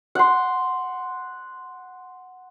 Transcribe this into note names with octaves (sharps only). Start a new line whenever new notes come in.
F#5 C6